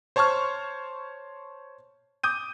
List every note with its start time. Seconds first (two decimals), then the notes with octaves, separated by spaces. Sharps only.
0.16 C5 C#5 A5 C6 C#6 F6
2.24 D6 D#6 G6 D#7